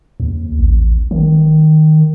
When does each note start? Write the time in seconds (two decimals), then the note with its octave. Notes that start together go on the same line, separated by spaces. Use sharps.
0.20 D#2
0.59 A1
1.11 D#3